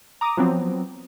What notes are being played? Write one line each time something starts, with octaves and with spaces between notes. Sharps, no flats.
A#5 D6 D#6
F3 F#3 B3 C4